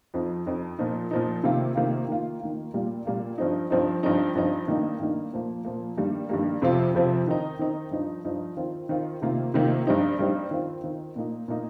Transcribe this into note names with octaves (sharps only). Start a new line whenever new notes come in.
F2 F3 D#4
F2 F3 D#4
A#2 F3 D#4
A#2 F3 D#4
C3 D#3 A#3 F4
C3 D#3 A#3 F4
D#3 A#3 F4
D#3 A#3 F4
A#2 G3 A#3 F4
A#2 G3 A#3 F4
G2 F3 C4 D#4
G2 F3 C4 D#4
G2 F3 C4 D#4
G2 F3 C4 D#4
G2 D#3 A#3 D#4
G2 D#3 A#3 D#4
A#2 F3 A#3
A#2 F3 A#3
G2 D#3 G3 A#3
G2 D#3 G3 A#3
F2 C3 F3 C4 F4
F2 C3 F3 C4 F4
D#3 C4 D#4
D#3 C4 D#4
G2 F3 D#4
G2 F3 D#4
D#3 C4 F4
D#3 C4 F4
C3 D#3 A#3 F4
C3 D#3 A#3 F4
G2 G3 C4 D#4
G2 G3 C4 D#4
D#3 C4 F4
D#3 C4 F4
A#2 A#3 D#4
A#2 A#3 D#4